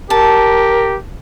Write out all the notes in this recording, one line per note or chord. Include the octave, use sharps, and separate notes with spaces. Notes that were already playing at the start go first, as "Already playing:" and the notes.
G4 A#4 A5